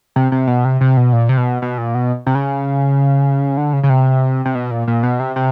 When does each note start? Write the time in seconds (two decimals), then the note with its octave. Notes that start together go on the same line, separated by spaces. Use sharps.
0.16 C3
0.32 C3
0.47 B2
0.65 C3
0.81 C3
0.97 B2
1.13 A#2
1.29 C3
1.37 B2
1.62 B2
1.78 A#2
1.95 B2
2.27 C3
2.35 C#3
3.57 D3
3.73 C#3
3.83 C#3
3.90 C3
4.45 C3
4.55 B2
4.71 A#2
4.87 A#2
5.03 B2
5.20 C3
5.36 C3